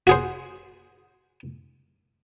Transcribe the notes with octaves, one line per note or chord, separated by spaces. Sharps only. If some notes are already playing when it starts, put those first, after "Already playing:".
F#4 G#4 C5